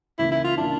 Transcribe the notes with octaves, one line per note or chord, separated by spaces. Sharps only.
C#2 C#3 E3 A#3 E4
E4
F4
C#3 E3 A#3 D4